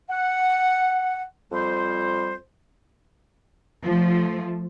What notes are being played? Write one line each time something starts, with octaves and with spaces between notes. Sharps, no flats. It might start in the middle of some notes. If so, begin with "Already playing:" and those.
F#5
F2 G3 C5
F3 A3